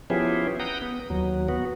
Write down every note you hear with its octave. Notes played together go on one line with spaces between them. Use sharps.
F3 B3 C#4 E4 G4 G#4
F#5 G5 A#5 D#6
B3
D#2 F#3
B3 F#4